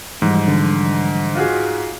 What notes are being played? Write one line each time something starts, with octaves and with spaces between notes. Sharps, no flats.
G#2 E3 F3 G3
D3
F4 F#4 G#4